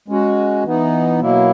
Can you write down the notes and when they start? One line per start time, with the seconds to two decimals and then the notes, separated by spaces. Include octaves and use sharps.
0.08 G#3 C#4 F#4
0.64 E3 B3 D#4
1.19 B2 F#3 A#3 E4